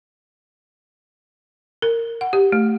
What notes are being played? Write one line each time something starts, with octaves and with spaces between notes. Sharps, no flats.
A#4
F#5
G4
A3